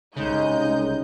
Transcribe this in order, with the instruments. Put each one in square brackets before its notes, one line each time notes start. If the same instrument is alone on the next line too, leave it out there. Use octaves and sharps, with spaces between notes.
[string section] C2 D#5 G6 [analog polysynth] C#3 [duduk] G#3 [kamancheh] D#4